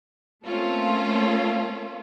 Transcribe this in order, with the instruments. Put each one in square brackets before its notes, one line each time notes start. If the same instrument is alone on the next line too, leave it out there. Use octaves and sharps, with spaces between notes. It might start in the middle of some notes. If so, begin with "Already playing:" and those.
[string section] A3 A#3 C4 C#4 F4 A4